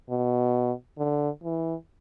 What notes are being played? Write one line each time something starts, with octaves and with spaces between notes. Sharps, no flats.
B2
D3
E3